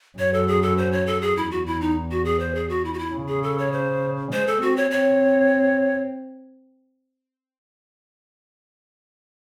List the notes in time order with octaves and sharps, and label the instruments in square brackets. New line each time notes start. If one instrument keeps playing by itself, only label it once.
[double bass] F#2 [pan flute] C#5
[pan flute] A4
G#4
A4
C5
C#5
A4
G#4
[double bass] E2 [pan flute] E4
[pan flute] F#4
E4
D#4
F#4
G#4
C5
G#4
F#4
E4
F#4
E4
[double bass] C#3
[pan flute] G#4
A4
C#5
C5
[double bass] G#3 [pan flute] C5
[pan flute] A4
[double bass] C4 [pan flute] F#4
[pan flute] C#5
[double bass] C4 [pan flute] C#5